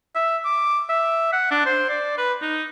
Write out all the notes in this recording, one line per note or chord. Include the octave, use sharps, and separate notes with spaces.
E5
D6
E5
F#5
D4
C5
D5
B4
D#4